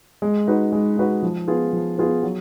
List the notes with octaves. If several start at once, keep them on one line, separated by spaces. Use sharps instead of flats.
G#3
D#4 F#4 B4
G#3
D#4 F#4 B4
F3
B3 F4 G#4 B4
F3
B3 F4 G#4 B4
F#3